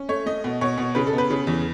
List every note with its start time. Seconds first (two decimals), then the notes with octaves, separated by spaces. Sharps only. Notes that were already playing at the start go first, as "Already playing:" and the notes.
Already playing: C#4
0.09 A3 C#5
0.26 A3 D#5
0.44 B2
0.61 B2 C#5
0.78 B2
0.95 C#3 B4
1.07 A4
1.13 B3 B4
1.30 C#3
1.47 E2